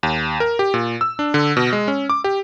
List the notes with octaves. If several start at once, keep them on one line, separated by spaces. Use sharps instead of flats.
D#2
A#4
G4
A#2
E6
D4
D3
B2
G#3
C#4
D6
G4